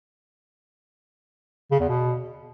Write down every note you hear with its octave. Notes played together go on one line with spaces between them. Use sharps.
C#3
E2
B2